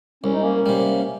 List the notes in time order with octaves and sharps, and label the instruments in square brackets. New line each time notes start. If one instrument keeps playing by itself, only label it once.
[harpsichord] C2 [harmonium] C#4
[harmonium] D#4
A#3 C#4
[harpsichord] C3 G3